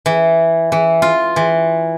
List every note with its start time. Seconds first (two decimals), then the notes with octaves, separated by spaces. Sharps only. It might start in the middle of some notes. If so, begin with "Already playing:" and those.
0.06 E3
0.72 E3
1.02 F4
1.36 E3